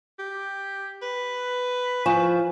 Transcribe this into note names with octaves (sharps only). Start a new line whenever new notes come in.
G4
B4
F3 G#5 C#6 E7